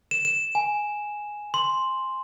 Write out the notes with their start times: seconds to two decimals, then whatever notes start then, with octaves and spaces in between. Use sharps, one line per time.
0.11 E7
0.25 E7
0.55 G#5
1.54 C6